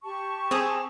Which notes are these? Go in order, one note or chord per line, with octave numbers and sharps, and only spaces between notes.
G4 A5 C#6
C4 G#4 D#6